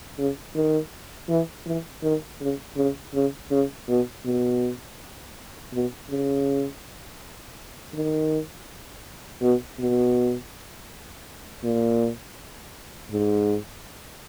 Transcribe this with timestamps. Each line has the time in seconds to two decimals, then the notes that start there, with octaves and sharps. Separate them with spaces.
0.18 C#3
0.55 D#3
1.29 E3
1.66 E3
2.03 D#3
2.41 C#3
2.77 C#3
3.14 C#3
3.51 C#3
3.88 B2
4.25 B2
5.73 B2
6.10 C#3
7.94 D#3
9.42 B2
9.79 B2
11.64 A#2
13.12 G#2